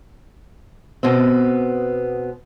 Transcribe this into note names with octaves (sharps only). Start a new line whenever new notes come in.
B2 B3 C4